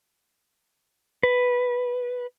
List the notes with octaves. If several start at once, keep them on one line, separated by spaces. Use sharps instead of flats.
B4